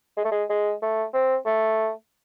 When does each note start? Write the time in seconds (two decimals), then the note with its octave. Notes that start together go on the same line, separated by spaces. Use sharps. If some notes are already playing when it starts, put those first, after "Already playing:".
0.17 G#3
0.25 A3
0.31 G#3
0.50 G#3
0.82 A3
1.13 C4
1.46 A3